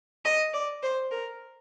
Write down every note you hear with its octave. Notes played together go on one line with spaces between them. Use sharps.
D#5
D5
C5
A#4